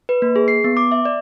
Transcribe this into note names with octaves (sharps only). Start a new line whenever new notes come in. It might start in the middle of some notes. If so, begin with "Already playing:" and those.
B4
A#3
G#4
C7
B3
D6
E5
D5